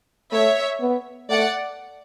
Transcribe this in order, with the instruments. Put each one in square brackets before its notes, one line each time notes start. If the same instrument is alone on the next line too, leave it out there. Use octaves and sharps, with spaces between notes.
[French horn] A3 [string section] C#5 E5
[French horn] B3
[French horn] A3 [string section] D5 F#5